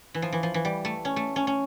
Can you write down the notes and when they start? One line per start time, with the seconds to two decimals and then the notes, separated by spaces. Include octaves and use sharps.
0.14 E3
0.22 F3
0.33 E3
0.43 F3
0.54 E3
0.65 G3
0.85 A3
1.05 C#4
1.16 A3
1.36 C#4
1.47 C#4